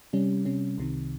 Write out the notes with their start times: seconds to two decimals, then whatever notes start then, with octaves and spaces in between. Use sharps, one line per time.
0.13 C3 G3 C#4
0.45 C3 G3 C#4
0.78 C2 C3 D#3